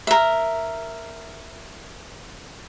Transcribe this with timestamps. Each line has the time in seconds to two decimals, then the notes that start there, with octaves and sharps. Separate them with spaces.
0.07 A#4 E5